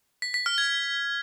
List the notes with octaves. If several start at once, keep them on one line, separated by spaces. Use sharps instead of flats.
B6
B6
F6
G#6